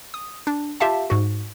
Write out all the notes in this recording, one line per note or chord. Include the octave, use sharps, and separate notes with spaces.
D#6
D4
F4 G4 E5 F5 A5
G#2 F#4